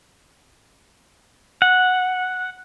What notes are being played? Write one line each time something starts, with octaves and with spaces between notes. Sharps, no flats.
F#5